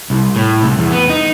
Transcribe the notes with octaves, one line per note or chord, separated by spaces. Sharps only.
C2
A2
C2
E2
B3
D#4